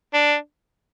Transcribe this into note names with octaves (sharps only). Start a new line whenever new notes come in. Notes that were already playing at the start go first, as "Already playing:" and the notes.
D4